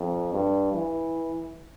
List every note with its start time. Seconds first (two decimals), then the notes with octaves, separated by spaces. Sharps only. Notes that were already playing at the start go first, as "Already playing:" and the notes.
Already playing: F2
0.33 G2
0.73 E3